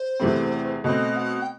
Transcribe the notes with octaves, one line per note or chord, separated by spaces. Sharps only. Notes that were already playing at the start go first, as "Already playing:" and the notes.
Already playing: C5
E2 C3 E3 A3 C4
B2 A3 C4 D#5
F#5
G5